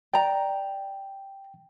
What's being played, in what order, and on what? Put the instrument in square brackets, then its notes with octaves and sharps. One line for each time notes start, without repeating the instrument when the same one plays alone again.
[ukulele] D5 A#5 [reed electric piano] G5